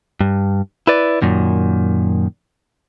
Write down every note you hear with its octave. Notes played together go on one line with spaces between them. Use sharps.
G2
E4 B4 D5
F#2 A#2 D#3